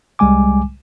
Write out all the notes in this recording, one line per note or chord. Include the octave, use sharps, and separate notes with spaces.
C2 G3 G#3 G#5 D6